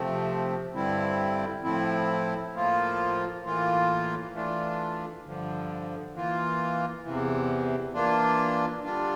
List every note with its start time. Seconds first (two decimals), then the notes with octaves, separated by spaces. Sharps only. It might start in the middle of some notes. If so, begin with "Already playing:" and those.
Already playing: C3 F3 A3 C4
0.72 G2 D3 G3 C4 E4
1.63 A2 F3 C4 E4
2.53 A2 F3 A#3 F4
3.43 A2 E3 A#3 F4
4.33 E3 A3 D4 F4
5.24 G2 D3 F3
6.13 E3 A#3 F4
7.04 E2 C3 E3
7.94 E3 A#3 D4 F4
8.84 D3 G3 D4 F4